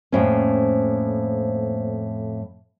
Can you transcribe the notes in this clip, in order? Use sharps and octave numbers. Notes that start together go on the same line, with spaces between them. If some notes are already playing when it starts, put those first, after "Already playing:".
F2 A2 A#3 C#4 C5